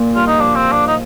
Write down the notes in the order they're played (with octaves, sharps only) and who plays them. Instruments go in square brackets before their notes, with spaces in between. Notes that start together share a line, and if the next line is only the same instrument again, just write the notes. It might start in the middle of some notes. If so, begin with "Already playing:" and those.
Already playing: [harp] A#2
[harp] G2 [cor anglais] F4
[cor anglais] D#4
[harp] F3 [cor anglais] D4
[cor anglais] C4
D4
D#4